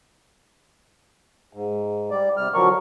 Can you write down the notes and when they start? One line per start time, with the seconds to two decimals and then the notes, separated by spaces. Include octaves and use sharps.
1.53 G#2
2.11 G3 D5
2.37 C3 G3 F6
2.54 D3 F3 F#3 A#4 C#6